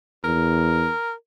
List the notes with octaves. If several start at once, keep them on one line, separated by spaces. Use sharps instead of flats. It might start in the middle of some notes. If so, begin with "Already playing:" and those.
E2 A#4